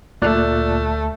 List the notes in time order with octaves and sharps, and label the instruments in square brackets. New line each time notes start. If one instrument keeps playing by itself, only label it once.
[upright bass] D2 [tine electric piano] A#2 D5 F#6 [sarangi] A3